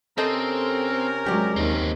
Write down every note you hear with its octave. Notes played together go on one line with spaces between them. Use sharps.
C3 C4 C#4 A4 A#4 C5 D#5
F#3 G#3 G4 D5
D#2 C4 D#4